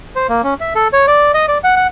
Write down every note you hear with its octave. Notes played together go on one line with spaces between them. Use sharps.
C5
A#3
C#4
E5
A4
C#5
D5
D#5
D5
F#5
F#5